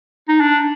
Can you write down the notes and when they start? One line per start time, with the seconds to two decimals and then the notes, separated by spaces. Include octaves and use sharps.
0.28 D#4
0.40 D4